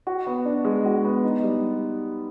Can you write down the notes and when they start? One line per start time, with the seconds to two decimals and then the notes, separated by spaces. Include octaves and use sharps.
0.07 F#4
0.27 B3
0.45 D4
0.65 G#3
0.85 F#4
1.05 B3
1.24 D#4
1.43 G3